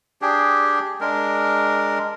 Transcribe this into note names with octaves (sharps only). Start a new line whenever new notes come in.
D4 G4 G#4
G#3 D4 A#4